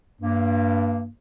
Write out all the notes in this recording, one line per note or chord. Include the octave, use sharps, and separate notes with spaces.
G2 A#3